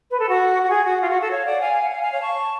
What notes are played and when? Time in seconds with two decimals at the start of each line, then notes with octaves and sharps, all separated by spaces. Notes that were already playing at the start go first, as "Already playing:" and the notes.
0.09 B4
0.18 A4
0.29 F#4
0.63 F#4
0.69 G#4
0.84 F#4
1.00 F4
1.10 F#4
1.20 A4
1.30 C#5 F5
1.45 D5 F#5
1.61 F5 G#5
1.73 F5
1.82 F#5
1.91 F5 G#5
2.02 F5 G#5
2.12 C#5 F5
2.22 A5 C#6